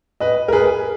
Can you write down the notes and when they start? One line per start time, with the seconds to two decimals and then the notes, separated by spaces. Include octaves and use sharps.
0.20 B4 D#5
0.48 A#4
0.52 G#4 B4